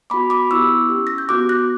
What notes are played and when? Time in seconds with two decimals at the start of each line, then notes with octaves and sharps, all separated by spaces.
0.10 B3 F#4 B5 D6
0.30 B5 D6
0.50 B3 E4 G4 C#6 E6
0.89 C#4 G4
1.07 A#6
1.18 G6
1.29 B3 F#4 D6 F#6
1.49 F#6 A#6